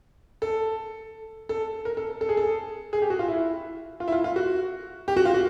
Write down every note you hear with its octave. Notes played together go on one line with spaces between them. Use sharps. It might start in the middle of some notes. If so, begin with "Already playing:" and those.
A4
A4
A#4
A4
A4
G#4
A4
G#4
G4
F#4
F4
E4
F4
E4
F4
F4
F#4
G4
F#4
F4
F#4